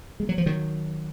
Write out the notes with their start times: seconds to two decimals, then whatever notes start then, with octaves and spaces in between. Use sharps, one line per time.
0.20 G#3
0.29 F#3
0.38 F3
0.46 D#3 F#3